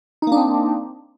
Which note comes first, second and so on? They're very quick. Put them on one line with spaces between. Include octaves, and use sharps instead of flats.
D#4 A#3 D4 C4